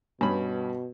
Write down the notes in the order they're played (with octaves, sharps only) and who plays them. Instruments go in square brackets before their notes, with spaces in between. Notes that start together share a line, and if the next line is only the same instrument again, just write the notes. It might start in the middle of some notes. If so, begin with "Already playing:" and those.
[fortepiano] G2 C#4 B5 [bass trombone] B2